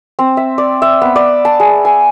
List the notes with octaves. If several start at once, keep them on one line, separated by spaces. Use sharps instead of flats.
C4
E5
D5
E5
B3
D5
A5
G#4
G#5